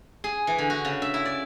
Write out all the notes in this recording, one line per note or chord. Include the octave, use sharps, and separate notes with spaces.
G#4
E3
D3
F#4
C#3
E5
E4
D5